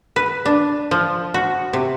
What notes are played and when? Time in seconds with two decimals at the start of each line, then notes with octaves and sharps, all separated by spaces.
0.16 B4
0.45 D4
0.91 F3
1.34 F#4
1.73 C3